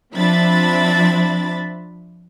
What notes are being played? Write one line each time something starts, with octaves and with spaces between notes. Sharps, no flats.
F3 C4 D4 E5 B5 A6